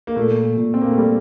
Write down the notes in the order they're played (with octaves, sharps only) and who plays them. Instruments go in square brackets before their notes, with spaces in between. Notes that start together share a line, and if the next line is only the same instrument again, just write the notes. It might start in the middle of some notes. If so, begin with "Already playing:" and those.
[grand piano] A#3
[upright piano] A#2 [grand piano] A3
[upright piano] A#2
[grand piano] C4
A#3
A3
[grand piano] G3 [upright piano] G4